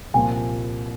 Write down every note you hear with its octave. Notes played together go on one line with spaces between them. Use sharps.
C2 A#2 F3 A#3 G#5